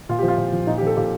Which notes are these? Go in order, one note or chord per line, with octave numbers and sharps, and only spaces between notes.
A#2 F4
F3 G4
F4
A#2
F3
A#2 D#4
G4
F3 A4
A#2 G4